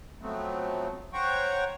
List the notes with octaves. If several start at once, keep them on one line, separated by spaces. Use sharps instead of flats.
F3 F#3 A3 B3 C4
C5 C#5 F#5 G5 A#5 C#6